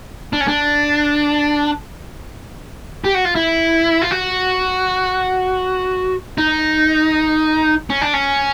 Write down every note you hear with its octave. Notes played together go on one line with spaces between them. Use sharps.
D4
C#4
D4
G4
F#4
F4
E4
F4
F#4
D#4
C#4
D4
C#4